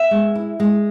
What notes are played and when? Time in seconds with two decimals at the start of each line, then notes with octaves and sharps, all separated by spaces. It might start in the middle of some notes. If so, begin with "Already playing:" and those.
Already playing: B3 E5
0.11 G#3
0.35 E4
0.60 G#3